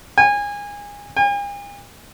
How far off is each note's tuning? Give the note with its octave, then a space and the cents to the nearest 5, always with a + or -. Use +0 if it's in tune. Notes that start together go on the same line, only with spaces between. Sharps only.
G#5 -25
G#5 -45